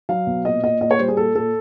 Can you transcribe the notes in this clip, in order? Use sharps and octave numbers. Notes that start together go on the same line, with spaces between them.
F#3 F5
B2
A#2 D#5
A#2 D#5
A#2 D#5
C#5
G3 C5
G#4
A#2 A4
A#2 A4